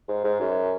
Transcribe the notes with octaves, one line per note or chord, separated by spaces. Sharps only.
G#2
G#2
F#2